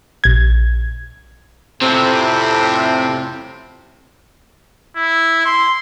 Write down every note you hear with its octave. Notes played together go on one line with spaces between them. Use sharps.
A#1 G#6
F2 A2 C3 G3 C4
E4
C6